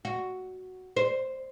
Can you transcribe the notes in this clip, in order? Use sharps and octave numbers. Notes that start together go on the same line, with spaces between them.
F#4
C5